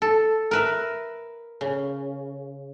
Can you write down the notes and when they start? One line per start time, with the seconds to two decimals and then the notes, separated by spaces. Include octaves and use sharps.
0.02 A4
0.51 A#4 B4 E5
1.61 C#3